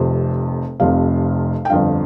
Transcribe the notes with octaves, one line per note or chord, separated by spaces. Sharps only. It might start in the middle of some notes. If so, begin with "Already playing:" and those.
Already playing: F1 F2 C3 C5
F1 F2 C3 F5
G5
G1 F2 D3 F5